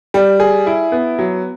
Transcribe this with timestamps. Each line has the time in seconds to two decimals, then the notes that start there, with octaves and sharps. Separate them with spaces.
0.14 G3
0.40 G#4
0.67 E4
0.92 B3
1.19 F#3